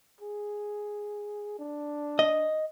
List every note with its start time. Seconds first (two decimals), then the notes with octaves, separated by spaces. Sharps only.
0.20 G#4
1.59 D4
2.19 D#5